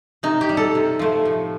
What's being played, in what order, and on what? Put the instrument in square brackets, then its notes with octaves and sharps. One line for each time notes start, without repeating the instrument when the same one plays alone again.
[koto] C3 D#4
G4
G3
A4
C3
F3 A3
A2